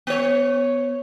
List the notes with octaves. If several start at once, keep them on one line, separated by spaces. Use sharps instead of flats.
B3 C#5